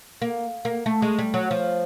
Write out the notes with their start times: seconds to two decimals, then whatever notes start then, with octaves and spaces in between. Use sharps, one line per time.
0.22 A#3
0.65 A#3
0.86 A3
1.02 G#3
1.19 G3
1.34 F#3
1.51 F3